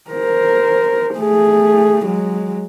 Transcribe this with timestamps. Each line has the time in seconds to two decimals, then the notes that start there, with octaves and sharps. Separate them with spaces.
0.11 A#4 C5
1.16 A3 G#4
2.05 F#3 G#3